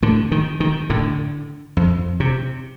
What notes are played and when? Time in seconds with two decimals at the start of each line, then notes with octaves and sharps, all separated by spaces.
0.02 A2 D3
0.32 D#3
0.60 D#3
0.90 A2 D3
1.77 F2
2.20 C3